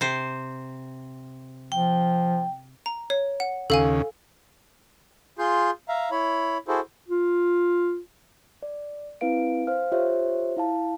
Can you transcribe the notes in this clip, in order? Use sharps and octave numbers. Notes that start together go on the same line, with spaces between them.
C3 C5
F3 G5
A#5
C#5
F#5
D#2 C#3 A4 F5 G#5
F4 G#4 C6 G6
E5 F5 A#5
E4 C#5 B5
E4 F#4 G#4 A4 C5
F4
D5
C4 E4 B4 F5 D7
C5 F5 F6
F4 G4 C5 C#5 E5
E4 F5 A5